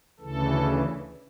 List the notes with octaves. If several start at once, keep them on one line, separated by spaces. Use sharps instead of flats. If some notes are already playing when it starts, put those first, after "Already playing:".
D2 C#3 E3 A4